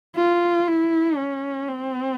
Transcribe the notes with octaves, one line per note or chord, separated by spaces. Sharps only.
F4
E4
C#4
C4